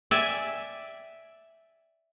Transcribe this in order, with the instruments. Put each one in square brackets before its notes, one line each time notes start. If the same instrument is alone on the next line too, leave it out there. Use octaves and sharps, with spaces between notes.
[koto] D5 E5 G5 G#5